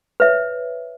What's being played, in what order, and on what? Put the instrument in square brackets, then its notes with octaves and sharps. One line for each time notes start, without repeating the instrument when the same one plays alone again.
[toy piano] B4 C#5 E5